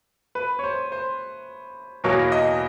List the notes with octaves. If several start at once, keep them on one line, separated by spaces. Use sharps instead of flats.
B4
C#5
C5
C5
E2 B2 F#3 A#3 C#5
D#5